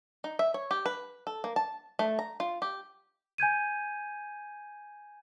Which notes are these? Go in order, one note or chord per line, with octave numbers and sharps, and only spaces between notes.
D#4
E5
C#5
G4
B4
A4
A#3
A5
A3
A#5
F4
G4
G#5 G6 G#6 D#7